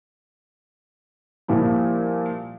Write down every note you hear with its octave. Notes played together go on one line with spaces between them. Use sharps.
A#2 F3 G3 E4